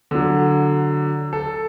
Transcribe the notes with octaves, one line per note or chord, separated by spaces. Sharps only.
D3 F#3
A4